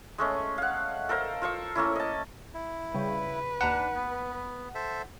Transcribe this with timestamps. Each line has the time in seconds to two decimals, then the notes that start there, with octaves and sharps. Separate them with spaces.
0.18 G#3 A3 C#4
0.58 F5 F#5
1.09 A4 A#4 C5 F5
1.42 F4 C5 C#6 E6
1.75 A3 A#3 C#4 E4
1.95 D#5 A5
2.54 E4
2.94 C#3 G3 B4
3.61 D#2 D4 F#5 A#5 E7
3.95 B3
4.75 A4 C5 E5